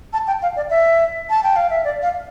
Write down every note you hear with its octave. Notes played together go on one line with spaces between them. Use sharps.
A5
G5
F5
D5
E5
A5
G5
F5
E5
D5
F5